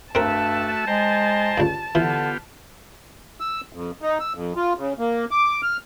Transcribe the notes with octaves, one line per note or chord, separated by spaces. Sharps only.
G2 A3 C4 F#4 A#4 E5 A5
G#3 C5 G5 A#5
C#2 G2
D3 E3 B3 F4 G4
E6
F2
D#4
E6
F2
F4
C#3
A#3
D6
F6